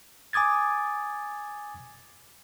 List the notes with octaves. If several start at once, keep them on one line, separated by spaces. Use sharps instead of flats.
G#5 D6 D#6 G#6 A6